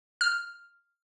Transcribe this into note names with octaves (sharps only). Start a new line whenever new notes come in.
F6